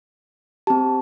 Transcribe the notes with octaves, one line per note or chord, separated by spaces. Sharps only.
C4 G4 A5